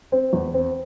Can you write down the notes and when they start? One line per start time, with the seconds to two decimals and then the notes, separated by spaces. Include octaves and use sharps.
0.12 C4
0.33 E2
0.54 C4